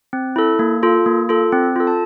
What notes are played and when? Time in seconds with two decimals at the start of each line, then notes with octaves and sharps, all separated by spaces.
0.13 C4
0.36 E4 A4
0.59 A#3
0.83 F4 A4
1.06 A#3
1.29 F4 A4
1.52 C4
1.76 F4 A4
1.87 A5